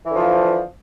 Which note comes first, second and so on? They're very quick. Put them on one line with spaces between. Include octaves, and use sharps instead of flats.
E3 D3 F3